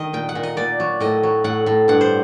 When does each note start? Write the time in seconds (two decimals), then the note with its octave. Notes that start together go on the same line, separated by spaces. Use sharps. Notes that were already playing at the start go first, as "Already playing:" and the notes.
Already playing: D#3 A#4 D#5
0.13 A#2 G5
0.29 F#5
0.35 A#2
0.43 D#5
0.57 A#2 D5
0.80 F#3
1.00 A2 D#5
1.23 F#3
1.44 A2 F#5
1.66 A2
1.88 G2 F#5
2.01 C5